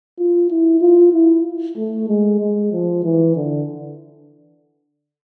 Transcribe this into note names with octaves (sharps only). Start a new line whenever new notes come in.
F4
E4
F4
E4
A3
G#3
G#3
F3
E3
D3